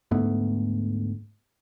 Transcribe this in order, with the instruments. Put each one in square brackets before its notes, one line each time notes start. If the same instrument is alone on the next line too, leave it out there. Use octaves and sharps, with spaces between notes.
[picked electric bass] D2 G#2 A3 B3